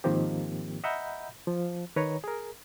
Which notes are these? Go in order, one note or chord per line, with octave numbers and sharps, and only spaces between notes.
G#2 D#3 F3 A#3 C4 G4
D#5 E5 F#5 A#5 B5 G6
F3
D#3 B4 C#5 A#5
G#4 A#4